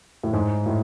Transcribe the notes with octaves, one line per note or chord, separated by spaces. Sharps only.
A2
G#2
A2